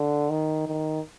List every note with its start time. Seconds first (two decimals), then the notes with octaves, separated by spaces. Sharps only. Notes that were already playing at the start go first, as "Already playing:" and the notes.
Already playing: D3
0.30 D#3
0.67 D#3